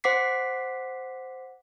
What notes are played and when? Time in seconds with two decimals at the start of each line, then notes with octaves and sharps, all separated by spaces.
0.04 C5 F#5 D6 B6 C7